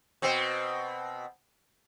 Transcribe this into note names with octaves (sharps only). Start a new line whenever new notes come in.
B2 C4